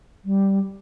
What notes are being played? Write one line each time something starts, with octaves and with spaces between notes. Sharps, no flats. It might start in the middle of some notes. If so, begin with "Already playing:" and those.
G3